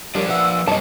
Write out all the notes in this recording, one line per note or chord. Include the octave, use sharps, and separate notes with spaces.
F3 G3 D4 A#4 C#5 D5
B4 E5 F#5 E6
F#2 B2 G3 C#5 D#5 A5